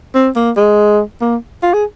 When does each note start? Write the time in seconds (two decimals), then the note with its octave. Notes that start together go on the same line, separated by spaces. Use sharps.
0.15 C4
0.36 A#3
0.57 G#3
1.21 A#3
1.63 F4
1.74 G#4